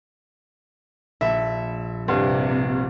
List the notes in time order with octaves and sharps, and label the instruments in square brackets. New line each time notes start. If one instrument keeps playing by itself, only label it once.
[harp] A#1 [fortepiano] E5
[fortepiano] C2 G2 [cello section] C3